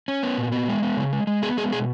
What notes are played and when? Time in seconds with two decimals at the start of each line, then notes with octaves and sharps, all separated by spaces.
0.08 C#4
0.23 B3
0.38 A#2
0.52 B3
0.68 G#3
0.82 B3
0.97 C#3
1.13 G#3
1.27 G#3
1.42 B3 G#4
1.57 G#3 G#4
1.73 B2 G#4